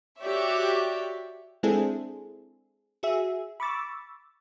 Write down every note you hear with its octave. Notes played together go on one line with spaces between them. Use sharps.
F#4 G4 C#5 D5 E5
G#3 C4 D4 E4 G#4 A4
F#4 G#4 E5
B5 C#6 D6 E6 A6